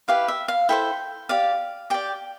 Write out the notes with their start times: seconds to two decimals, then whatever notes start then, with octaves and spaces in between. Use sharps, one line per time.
0.08 E4 G4 B4 F5
0.28 E5
0.48 F5
0.69 E4 A4 C5 G5
1.29 G4 D5 F5
1.90 G4 D5 G5